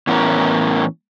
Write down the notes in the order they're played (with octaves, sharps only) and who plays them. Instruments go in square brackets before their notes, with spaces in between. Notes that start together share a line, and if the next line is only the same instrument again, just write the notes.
[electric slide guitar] A2 E3 B3 C#4 A#4